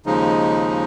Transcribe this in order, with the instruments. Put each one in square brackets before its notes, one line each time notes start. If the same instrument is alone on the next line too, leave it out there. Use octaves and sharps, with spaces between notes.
[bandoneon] D#2 C#3 F3 G#3 D#4